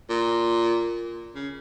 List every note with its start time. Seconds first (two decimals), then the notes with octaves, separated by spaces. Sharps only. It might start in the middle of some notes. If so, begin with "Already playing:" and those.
0.10 A#2
1.35 C#3